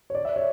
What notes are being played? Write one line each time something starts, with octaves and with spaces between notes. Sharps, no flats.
C#5
D5
E5
C#5